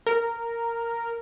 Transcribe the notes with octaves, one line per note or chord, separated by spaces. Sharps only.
A#4